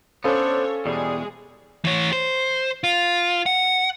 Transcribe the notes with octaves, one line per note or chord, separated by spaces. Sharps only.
B3 C#4 D4 A4 C5 C#5 F5
E2 B2 G3 G#3 G#4
E3 C#5
C5
F4
F#5